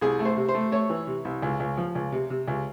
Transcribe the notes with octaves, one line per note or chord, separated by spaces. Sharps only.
C2 G#4
A3
C5
C3
C5
A3
A3 C#5
E3
C3
C2
C#2
C#2
F3
C#2
C3
C3
C#2